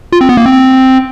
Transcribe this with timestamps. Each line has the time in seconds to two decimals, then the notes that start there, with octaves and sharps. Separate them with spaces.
0.12 F4
0.21 C4
0.29 B3
0.37 A#3
0.46 C4